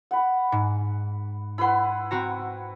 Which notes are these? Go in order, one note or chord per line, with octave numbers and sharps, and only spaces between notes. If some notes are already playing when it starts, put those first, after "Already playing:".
F#5 B5
G#2
E4 B4 F#5 B5 C6
C4 F#4 A#5